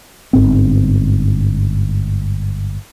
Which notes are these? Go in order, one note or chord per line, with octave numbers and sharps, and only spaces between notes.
G1 G#2 C4